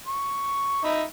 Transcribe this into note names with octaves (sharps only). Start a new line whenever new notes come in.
C#6
D#4 E5 B5